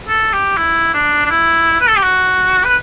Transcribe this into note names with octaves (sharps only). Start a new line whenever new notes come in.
A4
G4
E4
D4
D4
E4
B4
A4
G4
F#4
B4